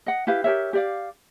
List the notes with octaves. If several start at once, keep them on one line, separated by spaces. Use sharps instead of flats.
D#5 F#5
E4 G4 B4 F5
G4 A#4 C#5 E5
G4 D5 F5